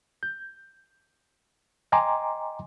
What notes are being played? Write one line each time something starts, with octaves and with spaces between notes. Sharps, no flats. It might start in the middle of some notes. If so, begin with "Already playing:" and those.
G6
D#5 G5 G#5 A#5 C6 D6